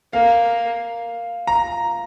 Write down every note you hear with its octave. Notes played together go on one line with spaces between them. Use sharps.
A#3 F5
A#5